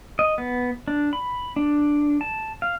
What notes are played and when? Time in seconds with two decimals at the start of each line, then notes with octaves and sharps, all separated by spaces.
0.19 D#5
0.38 B3
0.88 D4
1.13 B5
1.56 D4
2.21 A5
2.62 F5